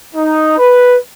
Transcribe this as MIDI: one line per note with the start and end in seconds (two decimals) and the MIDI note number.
0.15 0.55 63
0.58 0.95 71